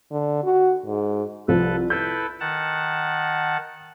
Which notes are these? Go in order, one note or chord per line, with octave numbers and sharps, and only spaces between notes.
D3
F#4
G#2
C2 F3 A4 B4
E4 A4 B4 G6
D#3 F#5 A5